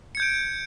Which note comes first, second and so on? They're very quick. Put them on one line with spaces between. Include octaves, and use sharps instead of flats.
C#7 G#6 G6 D7